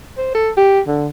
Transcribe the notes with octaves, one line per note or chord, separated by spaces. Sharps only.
C5
A4
G4
D3